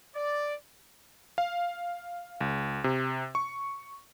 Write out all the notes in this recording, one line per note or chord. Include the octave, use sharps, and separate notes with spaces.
D5
F5
C#2
C3
C#6